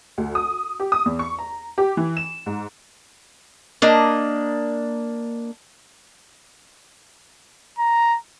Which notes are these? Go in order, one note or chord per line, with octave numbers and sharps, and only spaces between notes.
D2
D#6
G4
D#6
E2
C#6
A#5
G4
E3
E7
G#2
A#3 D4 D#5
A#5